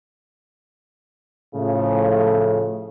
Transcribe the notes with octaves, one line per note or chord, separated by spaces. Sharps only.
A2 C#3 F3 A3